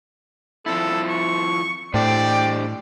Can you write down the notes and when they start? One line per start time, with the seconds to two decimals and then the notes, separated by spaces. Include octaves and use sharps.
0.66 F3 C4 E4 A4
1.08 C#6
1.94 A2 D4 G4 C5 D5 G5